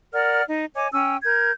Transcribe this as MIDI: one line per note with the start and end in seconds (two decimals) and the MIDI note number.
0.12 0.42 70
0.12 0.42 74
0.12 0.42 78
0.12 0.42 89
0.48 0.65 63
0.75 0.88 73
0.75 0.88 75
0.75 0.88 80
0.75 0.88 86
0.93 1.16 61
0.93 1.16 79
0.93 1.16 80
0.93 1.16 88
1.23 1.51 70
1.23 1.51 91
1.23 1.51 92